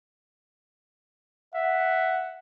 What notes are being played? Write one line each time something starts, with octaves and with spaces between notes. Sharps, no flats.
E5 F#5